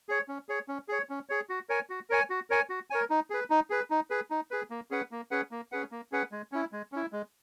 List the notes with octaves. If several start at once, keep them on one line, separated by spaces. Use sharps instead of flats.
G#4 C#5
C#4
G#4 C#5
C#4
G#4 C#5
C#4
G#4 C#5
F#4
A#4 C#5 G#5
F#4
A#4 C#5 G#5
F#4
A#4 C#5 G#5
F#4
A#4 C#5 G#5
D#4
G#4 B4
D#4
G#4 B4
D#4
G#4 B4
D#4
G#4 B4
A#3
C#4 G#4 B4 F#5
A#3
C#4 G#4 B4 F#5
A#3
C#4 G#4 B4 F#5
A#3
C#4 G#4 B4 F#5
G#3
C#4 E4
G#3
C#4 E4
G#3